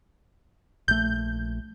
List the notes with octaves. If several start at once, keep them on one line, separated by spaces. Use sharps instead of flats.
A#1 A3 G6